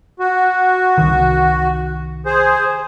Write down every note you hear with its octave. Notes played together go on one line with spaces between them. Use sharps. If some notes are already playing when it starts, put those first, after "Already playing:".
F#4
C2 D#3
G#4 C5